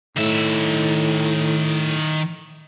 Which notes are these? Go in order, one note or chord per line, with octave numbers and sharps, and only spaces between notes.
A2 D#3 E5